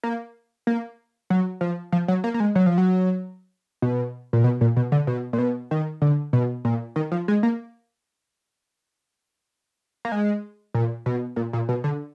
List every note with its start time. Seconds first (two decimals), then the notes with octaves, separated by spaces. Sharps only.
0.04 A#3
0.67 A#3
1.30 F#3
1.61 F3
1.92 F3
2.08 F#3
2.24 A#3
2.34 A#3
2.40 G#3
2.55 F#3
2.66 F3
2.78 F#3
3.82 B2
4.33 A#2
4.44 B2
4.61 A#2
4.76 B2
4.92 D3
5.07 B2
5.33 A#2
5.38 B2
5.71 D#3
6.02 D3
6.33 B2
6.65 A#2
6.96 D#3
7.12 F3
7.28 G#3
7.43 A#3
10.05 A#3
10.12 G#3
10.74 A#2
11.06 B2
11.36 A#2
11.53 A#2
11.69 B2
11.84 D3